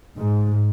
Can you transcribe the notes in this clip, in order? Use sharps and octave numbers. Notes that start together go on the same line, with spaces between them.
G#2